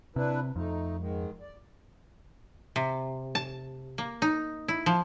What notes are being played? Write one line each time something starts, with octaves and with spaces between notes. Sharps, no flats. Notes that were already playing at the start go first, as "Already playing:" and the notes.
C3 D4 E4 B4
F2 A3 D#4
G#2 D#3 G#3
D5
C3
A5
A#3
D#4
E4
F3